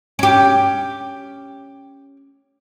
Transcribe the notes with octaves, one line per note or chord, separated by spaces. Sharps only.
C#4 G4